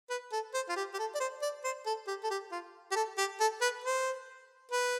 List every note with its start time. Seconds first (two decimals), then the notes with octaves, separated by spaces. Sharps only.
0.10 B4
0.32 A4
0.54 C5
0.69 F4
0.76 G4
0.94 G4
0.99 A4
1.15 D5
1.20 C5
1.42 D5
1.64 C5
1.86 A4
2.08 G4
2.23 A4
2.31 G4
2.52 F4
2.92 G4
2.96 A4
3.18 G4
3.40 A4
3.61 B4
3.84 C5
4.72 B4